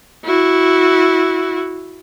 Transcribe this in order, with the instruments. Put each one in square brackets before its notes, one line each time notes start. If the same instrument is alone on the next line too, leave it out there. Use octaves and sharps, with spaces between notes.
[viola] E4 F#4